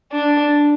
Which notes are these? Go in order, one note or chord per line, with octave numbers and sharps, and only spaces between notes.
D4